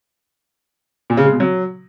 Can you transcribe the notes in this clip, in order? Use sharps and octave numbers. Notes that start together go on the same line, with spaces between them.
A#2
C#3
G#3
B2
F#3